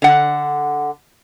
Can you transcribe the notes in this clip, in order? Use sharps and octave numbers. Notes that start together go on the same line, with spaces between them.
D3 F#5